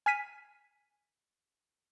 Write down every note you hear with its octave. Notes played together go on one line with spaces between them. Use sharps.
G#5 F6 B6 D#7